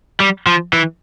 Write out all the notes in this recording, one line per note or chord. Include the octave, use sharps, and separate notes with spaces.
G3
F3
E3